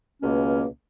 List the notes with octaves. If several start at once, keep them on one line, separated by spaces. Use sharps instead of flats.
C#2 B2 A#3 C#4